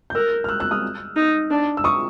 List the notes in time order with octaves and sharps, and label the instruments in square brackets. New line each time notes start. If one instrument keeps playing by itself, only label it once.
[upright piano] G6
[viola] A#4 [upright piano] E6 F#6
[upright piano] F6
E6 F#6
E6 F#6
D#6 F6
[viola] D#4
D4
[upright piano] E6
C#6 D#6